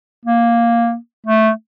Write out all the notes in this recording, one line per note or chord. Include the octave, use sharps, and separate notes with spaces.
A#3
A3